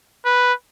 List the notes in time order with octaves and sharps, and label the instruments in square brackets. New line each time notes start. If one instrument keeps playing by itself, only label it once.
[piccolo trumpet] B4